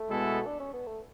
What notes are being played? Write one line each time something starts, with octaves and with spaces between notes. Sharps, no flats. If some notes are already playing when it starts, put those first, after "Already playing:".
Already playing: A3
B2 G#3 B3 E4 A4
D4
C#4
B3
A3